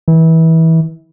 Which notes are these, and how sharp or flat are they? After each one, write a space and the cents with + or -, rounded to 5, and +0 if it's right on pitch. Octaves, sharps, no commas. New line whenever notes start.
E3 -25